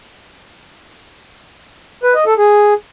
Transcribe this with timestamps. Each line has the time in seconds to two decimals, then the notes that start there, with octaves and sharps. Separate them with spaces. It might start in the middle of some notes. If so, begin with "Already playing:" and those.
2.03 B4
2.15 D#5
2.26 A4
2.38 G#4